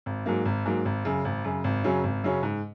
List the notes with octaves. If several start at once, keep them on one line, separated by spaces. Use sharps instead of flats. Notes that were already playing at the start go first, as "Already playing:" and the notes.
G#1
G#2 F#3 A#3
G#1
G#2 F#3 A#3
G#1
F#2 C#3
G#1
F#2 C#3
G#1
F#2 C#3 F#3 C#4
G#1
F#2 C#3 F#3 C#4
G#2